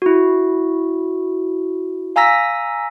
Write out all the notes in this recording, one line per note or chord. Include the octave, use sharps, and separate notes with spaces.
E4 F#4
F5 G#5 A#5 E6 A#6 B6